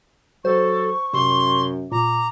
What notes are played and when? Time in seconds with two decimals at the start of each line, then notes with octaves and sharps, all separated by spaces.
0.45 F#3 A4 C5 C#6
1.14 F#2 C3 C6
1.92 A#2 A#5 D6